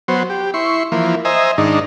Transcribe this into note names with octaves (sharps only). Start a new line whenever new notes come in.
F#3 B3 C5
G4
E4 C6 C#6
E3 F3 A#3
C5 D#5 E5 G#5 A#5
G#2 D#3 D4 D#4